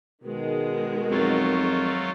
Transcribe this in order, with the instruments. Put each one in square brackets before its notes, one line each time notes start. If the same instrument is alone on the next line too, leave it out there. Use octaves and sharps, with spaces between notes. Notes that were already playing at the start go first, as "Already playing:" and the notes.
[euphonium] B2 [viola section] D#3 G#3
[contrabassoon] F2 [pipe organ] F#3 A3 F4